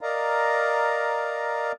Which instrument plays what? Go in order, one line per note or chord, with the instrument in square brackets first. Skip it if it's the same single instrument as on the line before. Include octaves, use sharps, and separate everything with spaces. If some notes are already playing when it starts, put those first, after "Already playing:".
[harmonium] A#4 D5 D#5 F5 A#5